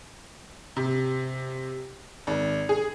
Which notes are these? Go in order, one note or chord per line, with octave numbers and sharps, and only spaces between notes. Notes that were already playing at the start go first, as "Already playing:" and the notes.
C3
G#1
G#4